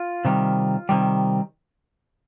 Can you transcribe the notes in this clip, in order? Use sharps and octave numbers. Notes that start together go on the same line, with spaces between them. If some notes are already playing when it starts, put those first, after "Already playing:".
Already playing: F4
C3 D#3 G3
C3 D#3 G3